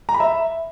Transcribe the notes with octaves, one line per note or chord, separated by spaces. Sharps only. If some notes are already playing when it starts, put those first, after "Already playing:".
A#5
B5
E5